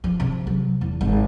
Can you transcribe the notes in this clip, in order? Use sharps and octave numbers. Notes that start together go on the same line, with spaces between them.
F3
C3
F#3
E2
G#1